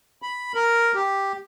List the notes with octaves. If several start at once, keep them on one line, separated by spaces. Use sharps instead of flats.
B5
A#4
G4